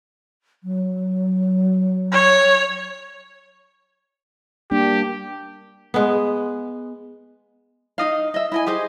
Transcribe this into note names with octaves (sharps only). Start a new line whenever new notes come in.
F#3
C#5
G3 A#3 D4 G4
G#3 B3
D#4 D#5 F5
D#5 E5
E4 D#5 G#5
G4 G#4 C5 D#5